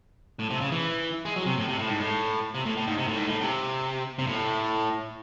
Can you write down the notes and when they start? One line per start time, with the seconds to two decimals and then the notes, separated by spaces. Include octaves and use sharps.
0.39 A2
0.50 C3
0.61 C#3
0.72 E3
1.25 G#3
1.36 F#3
1.47 C3
1.58 A2
1.69 C3
1.79 A2
1.89 G#2
1.99 A2
2.54 C3
2.65 A2
2.77 A2
2.87 G#2
2.98 C3
3.08 A2
3.16 G#2
3.26 A2
3.41 C3
4.19 C3
4.27 A2